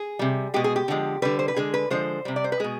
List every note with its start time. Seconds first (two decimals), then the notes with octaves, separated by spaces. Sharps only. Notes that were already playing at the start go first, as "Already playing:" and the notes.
Already playing: G#4
0.19 C3 G3
0.54 B2 G#3 G4
0.64 G#4
0.76 G4
0.88 D3 F3 G#3
1.22 D3 G3 B4
1.39 C5
1.48 B4
1.56 D3 G#3 G#4
1.74 B4
1.90 D3 F3 G#3 C5
2.25 C3 G3
2.36 D5
2.44 C5
2.52 B4
2.60 B2 G#3 G#4